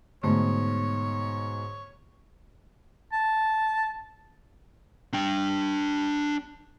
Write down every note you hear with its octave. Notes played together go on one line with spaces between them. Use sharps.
G#2 B2 D3 A3 C#5
A5
D4 G5